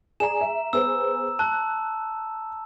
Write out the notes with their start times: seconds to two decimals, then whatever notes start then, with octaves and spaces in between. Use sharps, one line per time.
0.20 G#4 D5 G#5 A#5 E7
0.41 E5
0.73 B3 G#4 C5 E6
1.39 A5 F#6